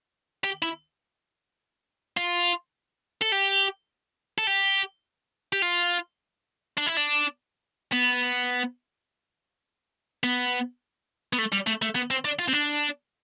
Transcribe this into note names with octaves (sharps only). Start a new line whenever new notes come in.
G4
E4
F4
A4
G4
A4
G4
G4
F4
D4
E4
D4
B3
B3
B3
A3
G3
A3
A3
B3
C4
D4
F4
C4
D4